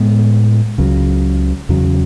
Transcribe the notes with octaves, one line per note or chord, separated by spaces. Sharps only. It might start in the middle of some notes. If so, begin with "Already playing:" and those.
Already playing: A2 G#3 B3
C#2 C#3 F#3
E2 C#3 F#3